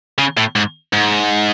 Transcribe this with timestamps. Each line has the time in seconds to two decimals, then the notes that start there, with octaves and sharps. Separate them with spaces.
0.18 C#3
0.37 A2
0.55 G#2
0.93 G#2